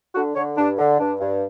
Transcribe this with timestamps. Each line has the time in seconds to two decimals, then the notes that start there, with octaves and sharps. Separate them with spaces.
0.15 D3 F#4
0.35 D3 C#5
0.57 G2 D4
0.79 D3
0.99 G2 D4
1.20 G2